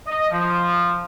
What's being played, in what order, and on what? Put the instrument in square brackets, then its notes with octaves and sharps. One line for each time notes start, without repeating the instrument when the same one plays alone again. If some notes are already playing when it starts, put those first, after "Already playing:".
[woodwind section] D#5
F3